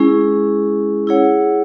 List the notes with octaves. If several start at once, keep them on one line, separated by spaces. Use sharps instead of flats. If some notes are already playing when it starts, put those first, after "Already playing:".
Already playing: G#3 C#4 E4 G#4
E4 G#4 C#5 F#5